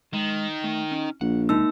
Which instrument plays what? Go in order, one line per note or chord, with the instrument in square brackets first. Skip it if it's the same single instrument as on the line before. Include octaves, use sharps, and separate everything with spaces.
[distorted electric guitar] D#3 [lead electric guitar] G#3
[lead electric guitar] A3
C#4
[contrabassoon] A#1 [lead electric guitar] F#5
[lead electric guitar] C3 G#3 [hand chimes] A#3 D#4 E6